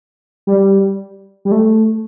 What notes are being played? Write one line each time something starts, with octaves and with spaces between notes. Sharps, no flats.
G3
G3
A3